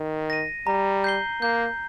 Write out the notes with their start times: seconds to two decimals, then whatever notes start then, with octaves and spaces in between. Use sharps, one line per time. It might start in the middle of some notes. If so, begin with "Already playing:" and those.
Already playing: D#3
0.30 A#6 D#7
0.67 G3 A#5
1.04 G6 C7 G7
1.41 A#3 G6